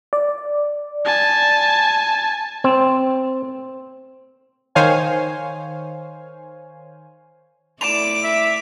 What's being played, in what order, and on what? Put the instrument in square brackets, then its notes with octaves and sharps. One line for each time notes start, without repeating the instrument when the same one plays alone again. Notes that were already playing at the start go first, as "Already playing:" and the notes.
[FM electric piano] D5
[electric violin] G#5 A5
[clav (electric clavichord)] C4
[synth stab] D#3 C5 C#5 F5 G#5
[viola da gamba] A3 E4 D5 [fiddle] D6 [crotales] E7 F7
[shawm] E5